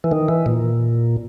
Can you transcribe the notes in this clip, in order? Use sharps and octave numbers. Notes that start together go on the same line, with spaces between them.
E3
D#3
E3
A#2